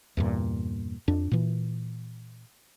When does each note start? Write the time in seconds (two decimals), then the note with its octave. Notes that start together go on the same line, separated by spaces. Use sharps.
0.17 E2 G2 A#2
1.08 F2 D4
1.31 A#2 E3